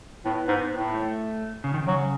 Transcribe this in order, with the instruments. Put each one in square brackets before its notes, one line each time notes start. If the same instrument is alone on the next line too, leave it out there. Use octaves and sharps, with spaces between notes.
[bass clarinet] A2 [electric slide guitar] B3
[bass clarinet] G#2
A2
[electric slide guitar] A3
C#3
D#3
[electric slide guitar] C#3 [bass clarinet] F#3